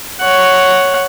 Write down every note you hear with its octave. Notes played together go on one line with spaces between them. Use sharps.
C#5 F#5